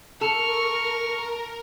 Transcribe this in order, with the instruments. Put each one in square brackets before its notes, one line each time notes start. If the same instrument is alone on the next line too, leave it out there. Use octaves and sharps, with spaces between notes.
[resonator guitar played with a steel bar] A4 [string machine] A#4 [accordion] C#6 [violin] F6